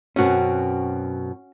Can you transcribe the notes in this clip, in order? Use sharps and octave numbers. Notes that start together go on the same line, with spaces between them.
F#2 B2 C4 C#4 F#4